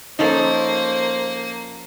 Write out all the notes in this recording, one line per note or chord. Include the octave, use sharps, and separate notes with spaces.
F3 A#3 C#4 D#4 A4 C5